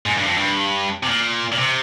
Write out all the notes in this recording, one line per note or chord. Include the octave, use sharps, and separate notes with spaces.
G#2
G2
F2
G2
C3
A#2
A#2
C3